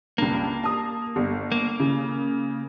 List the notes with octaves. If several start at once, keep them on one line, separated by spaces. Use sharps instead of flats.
C#2 G2 A#3
A5 D#6
G1
A#3
C#3